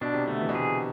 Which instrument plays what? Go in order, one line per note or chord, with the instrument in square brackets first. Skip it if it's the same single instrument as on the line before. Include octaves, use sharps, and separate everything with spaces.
[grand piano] B2 [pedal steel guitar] D4
[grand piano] C3
[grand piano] D3 [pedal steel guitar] A3
[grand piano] E3
B2
[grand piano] C3 [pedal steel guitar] G#4